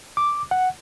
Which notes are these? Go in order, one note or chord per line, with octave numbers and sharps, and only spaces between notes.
D6
F#5